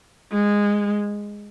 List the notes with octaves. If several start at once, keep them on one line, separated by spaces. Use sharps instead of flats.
G#3